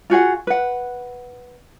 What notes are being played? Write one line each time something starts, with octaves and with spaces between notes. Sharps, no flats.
F4 F#4 G#4 F#5
B4 F#5